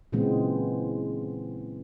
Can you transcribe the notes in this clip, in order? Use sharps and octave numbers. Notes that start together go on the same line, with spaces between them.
A#2 C#3 E3 G#3 B3 C4